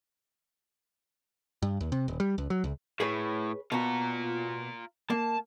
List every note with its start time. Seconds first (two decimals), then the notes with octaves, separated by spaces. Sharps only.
1.62 G2
1.81 D#2
1.92 C3
2.08 D#1
2.20 G3
2.38 C#2
2.50 F#3
2.64 C#2
3.00 A2 G#4 B4 C#5
3.72 B2 F4 F#4 A#5
5.10 A#3 A5